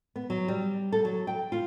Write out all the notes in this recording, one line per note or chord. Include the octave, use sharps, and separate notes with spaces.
B3
F#3
G3
A4
F#3
G5
F4